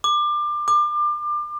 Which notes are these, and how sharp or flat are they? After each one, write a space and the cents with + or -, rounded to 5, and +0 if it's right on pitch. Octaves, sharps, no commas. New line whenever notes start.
D6 +25
D6 +30